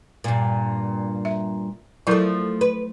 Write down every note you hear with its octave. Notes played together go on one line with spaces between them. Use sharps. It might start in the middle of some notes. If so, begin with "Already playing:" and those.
G2 A#2
E5
F3 F#3 A3 E4 A#4
B4